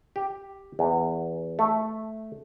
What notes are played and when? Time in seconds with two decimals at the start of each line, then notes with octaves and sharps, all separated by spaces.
0.16 G4
0.79 E2
1.59 A3